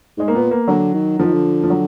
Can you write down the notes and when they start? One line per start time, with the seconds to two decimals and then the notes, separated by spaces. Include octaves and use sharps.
0.17 G#2 G#3
0.28 A#3
0.35 A#2 B3
0.51 A#3
0.68 D3 F#3
0.94 D#3
1.19 D3 F3
1.26 D#3
1.34 D3
1.64 F3
1.70 F#3